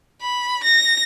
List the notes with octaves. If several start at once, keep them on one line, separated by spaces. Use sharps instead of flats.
B5
A#6